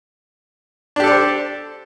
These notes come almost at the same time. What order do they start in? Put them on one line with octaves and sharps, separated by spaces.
D4 G4 A4 D5 C5